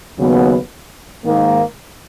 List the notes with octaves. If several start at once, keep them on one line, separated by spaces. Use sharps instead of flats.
D#2 C#3 F#3 B3
G#2 D#3 A#3